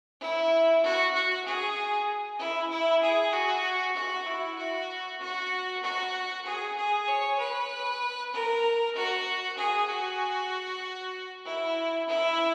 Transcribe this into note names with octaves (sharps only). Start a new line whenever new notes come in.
E4
F#4
F#4
G#4
E4
E4
G#4
F#4
F#4
E4
F#4
F#4
F#4
G#4
G#4
C#5
B4
A#4
F#4
G#4
F#4
E4
E4